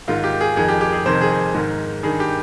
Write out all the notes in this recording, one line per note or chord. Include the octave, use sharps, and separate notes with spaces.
G#2 D#3 F4
G4
G#4
F2 D#3 G#4
G4
G4
G#4
F2 C3 D#3 C5
G#4
G#2 D#3
G2 D#3 G#4
G4